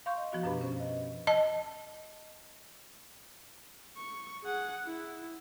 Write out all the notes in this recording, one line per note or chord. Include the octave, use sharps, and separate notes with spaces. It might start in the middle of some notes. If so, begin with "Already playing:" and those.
F5 C6 C#6 G6
D#5
F3 B3 F#4 F5
F#2 B2 D4 G4 B4 B5
C#4 C5
D#5
D#5 A5
C#6
G#4 F#5
E4